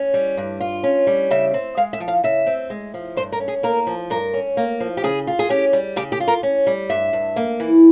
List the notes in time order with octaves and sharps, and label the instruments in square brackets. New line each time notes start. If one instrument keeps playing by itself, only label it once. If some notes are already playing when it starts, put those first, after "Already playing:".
Already playing: [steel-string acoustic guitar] C#4
G3
G2
F4
C#4
G3
C#3 E5
C4
G#3 F5
E5
F3
F5
C#3 E5
C4
G#3
F3
G2 C5
A#4
C#4
G#4
A#3 A#4
F3
G2 A#4
C#4
A#3
F3
G4
C#3 G#4
F4
G#4
C#4 G4
G3
C#3 G4
G4
F4
A#4
C#4
G3
G2 E5
G2
A#3
E3